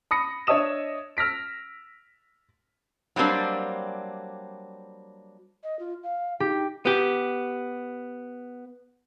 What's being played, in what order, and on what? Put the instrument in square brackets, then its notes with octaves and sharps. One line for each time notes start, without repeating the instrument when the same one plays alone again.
[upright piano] B5 D#6 A#6 C#7
D4 C#5 D#5 E5 D#6 E7
E6 F6 A#6 B6 D7
[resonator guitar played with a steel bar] F#3 G3 A#3 C4 D4
[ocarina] D#5
F4
F5
[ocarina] D#4 [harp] G4
[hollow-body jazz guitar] B3 G4